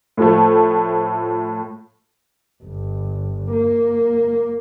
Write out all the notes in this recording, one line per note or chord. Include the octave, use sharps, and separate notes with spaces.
A2 F3 A3
G1
A#3